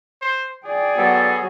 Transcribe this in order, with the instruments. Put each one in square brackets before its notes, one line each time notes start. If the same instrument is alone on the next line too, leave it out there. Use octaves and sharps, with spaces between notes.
[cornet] C5
[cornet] G#4 [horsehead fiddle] D5 G5
[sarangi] F#3 [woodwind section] B3 A4